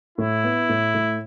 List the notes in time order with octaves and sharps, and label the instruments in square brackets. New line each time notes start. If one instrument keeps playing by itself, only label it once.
[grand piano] A2 [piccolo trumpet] E4
[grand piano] B3
A2
A2